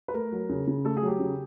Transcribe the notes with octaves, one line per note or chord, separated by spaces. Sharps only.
B4
A3 A#4
F#3
C#3
C#3
A3 A4
G#4
F#3
G4
C#3